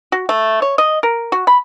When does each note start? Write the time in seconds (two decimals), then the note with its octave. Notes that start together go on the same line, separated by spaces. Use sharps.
0.12 F#4
0.29 A3
0.62 C#5
0.78 D#5
1.03 A#4
1.32 F#4
1.47 B5